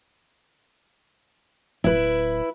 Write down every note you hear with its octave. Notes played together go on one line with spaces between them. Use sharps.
D1 E4 B4